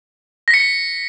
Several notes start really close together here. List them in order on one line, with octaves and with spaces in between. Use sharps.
A#6 B6 C#7